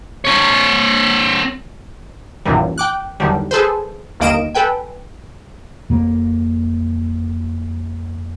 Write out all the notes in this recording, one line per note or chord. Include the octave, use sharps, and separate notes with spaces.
C4 C#5
A#1 F#2 A#2 D#3 E3 G3
G5 D6 F#6
E2 D3 D#3 F#3 G3
G#4 A4 B4 C5
G1 D#2 A#3 D#5 D7 E7
A4 B4 G5 G#5
F2 A#3